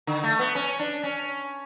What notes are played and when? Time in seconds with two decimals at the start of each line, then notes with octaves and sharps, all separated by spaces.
0.07 D3
0.24 A3
0.39 B3
0.55 C#4
0.79 D4
1.03 C#4